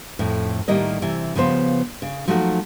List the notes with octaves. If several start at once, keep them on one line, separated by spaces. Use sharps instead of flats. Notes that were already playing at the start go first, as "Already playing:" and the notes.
F2 A2
A2 D#3 G3 A#3 D#5
C3 E3
C#3 F3 B3 C5
C#3
F3 F#3 A3 A#3 D#4 F#4